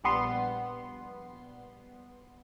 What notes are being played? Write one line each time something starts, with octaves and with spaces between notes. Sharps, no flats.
A#1 G3 B3 C6 C7